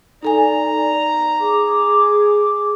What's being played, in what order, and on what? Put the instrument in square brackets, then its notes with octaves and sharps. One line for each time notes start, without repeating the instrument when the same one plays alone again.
[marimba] D#4 A4 G#5 [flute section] D5 [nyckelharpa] A#5
[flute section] G#4 D6